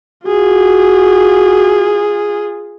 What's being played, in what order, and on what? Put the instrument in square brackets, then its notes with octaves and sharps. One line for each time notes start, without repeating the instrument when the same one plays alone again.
[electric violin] F4 G#4 [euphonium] F#4